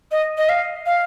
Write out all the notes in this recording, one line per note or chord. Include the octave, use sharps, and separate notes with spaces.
D#5
D#5
F5
F5